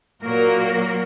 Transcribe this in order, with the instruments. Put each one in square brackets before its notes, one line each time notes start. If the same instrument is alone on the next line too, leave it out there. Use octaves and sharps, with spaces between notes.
[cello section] A#2 F#3 A#3 F#4 A#4